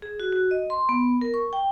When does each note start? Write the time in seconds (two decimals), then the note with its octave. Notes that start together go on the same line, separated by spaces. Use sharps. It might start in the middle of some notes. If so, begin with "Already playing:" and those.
0.02 G#4
0.20 F#4
0.32 F#4
0.51 D#5
0.70 C6
0.89 B3
1.21 A#4
1.34 C#6
1.53 G5